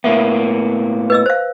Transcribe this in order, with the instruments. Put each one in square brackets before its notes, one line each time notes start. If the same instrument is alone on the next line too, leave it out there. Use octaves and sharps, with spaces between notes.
[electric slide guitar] A2 A#3 B3 [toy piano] E5
[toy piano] B4 D#5 E6
C5 F5